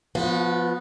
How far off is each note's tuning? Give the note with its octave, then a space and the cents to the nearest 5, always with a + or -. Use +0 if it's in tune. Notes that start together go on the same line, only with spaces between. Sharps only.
F3 +0 B3 +0 F#4 -35